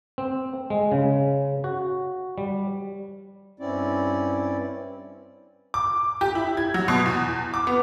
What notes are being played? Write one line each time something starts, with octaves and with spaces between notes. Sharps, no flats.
C4
G#3
C#3
F#4
G3
G2 C4 C#4 E4 D5
D6
G4
E4
G#6
F#3
B2
E2
D6
B3